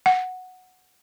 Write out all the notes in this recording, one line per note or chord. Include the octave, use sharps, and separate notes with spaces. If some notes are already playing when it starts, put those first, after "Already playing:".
F#5